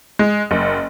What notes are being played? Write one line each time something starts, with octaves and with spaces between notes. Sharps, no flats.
G#3
F#1